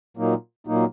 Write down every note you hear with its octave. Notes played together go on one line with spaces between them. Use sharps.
A#2 F#3 A#3 D#4
A#2 F#3 A#3 D#4